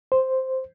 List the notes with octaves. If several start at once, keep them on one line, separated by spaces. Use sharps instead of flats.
C5